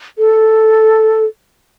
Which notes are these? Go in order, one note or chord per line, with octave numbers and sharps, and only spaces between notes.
A4